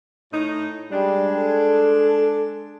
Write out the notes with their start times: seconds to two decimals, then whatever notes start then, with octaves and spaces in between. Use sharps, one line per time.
0.33 A2 D#4
0.92 G3 G#3 D4
1.38 A4